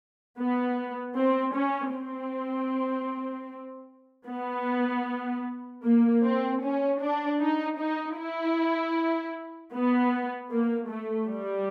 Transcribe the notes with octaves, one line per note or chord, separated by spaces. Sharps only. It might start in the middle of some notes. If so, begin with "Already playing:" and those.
B3
C4
C#4
C4
B3
A#3
C4
C#4
D4
D#4
D#4
E4
B3
A#3
A3
G3